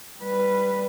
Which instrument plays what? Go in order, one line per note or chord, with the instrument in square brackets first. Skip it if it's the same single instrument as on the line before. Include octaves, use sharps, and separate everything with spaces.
[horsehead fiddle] G3 B4